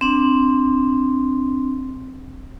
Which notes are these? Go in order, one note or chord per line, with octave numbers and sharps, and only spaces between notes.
C4 D4